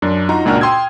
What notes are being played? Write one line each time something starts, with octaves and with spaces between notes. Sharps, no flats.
F#2 D4
D#4 F4 F#4 A#5
C#2 A#2 D4 F#4 A#5 F6
G5 C6 D#6 E6 G#6